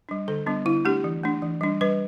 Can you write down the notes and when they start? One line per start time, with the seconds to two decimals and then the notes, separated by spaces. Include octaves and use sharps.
0.09 G3 D4
0.28 D3 A4
0.47 G3 B3 D4
0.65 D3 E4
0.85 A3 D4 G4
1.04 E3
1.23 A3 D4
1.42 E3
1.61 G3 D4
1.81 G3 B4